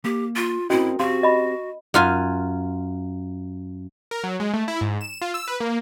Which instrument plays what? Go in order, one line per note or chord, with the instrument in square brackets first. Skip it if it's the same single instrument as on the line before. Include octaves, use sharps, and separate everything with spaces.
[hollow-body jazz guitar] A#3 [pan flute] G4
[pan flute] F4
[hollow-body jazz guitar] C4 A#4 D#5 [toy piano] C#4 F#4 [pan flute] E4
[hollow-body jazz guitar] C4 G4 F5 [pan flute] F#4 [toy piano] C6
[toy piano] D#5 B5
[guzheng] F#2 F4 G#5
[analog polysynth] A#4
F#3
G#3
A3
E4
G#2
E7
F4
E6
B4
A#3